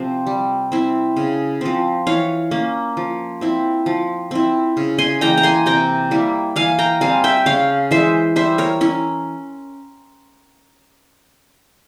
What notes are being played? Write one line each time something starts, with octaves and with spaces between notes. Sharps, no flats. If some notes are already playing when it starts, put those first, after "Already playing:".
Already playing: C3 F3 C4
G3
C4 E4
C#3
F3 C4
E3 C#5 F5
A#3 C#4
F3
C4 E4
F3
C4 E4
C#3
G#5 C6
E3 A#3 G5 A#5
A#5
G#5 C6
C3 G5 A#5
G3 A#3 E4
E3 F5 G#5
G5 A#5
G3 C4 F5 G#5
E5 G5
C#3 C#5 F5
E3 G#3 C5 E5
G3 C5 E5
A#4 C#5
C#4 E4